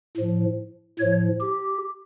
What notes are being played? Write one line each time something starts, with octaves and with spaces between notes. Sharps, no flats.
A2 F3
A2 F3 C#5
G4